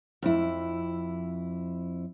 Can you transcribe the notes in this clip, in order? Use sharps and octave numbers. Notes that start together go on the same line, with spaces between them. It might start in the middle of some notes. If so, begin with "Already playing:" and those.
F2 E4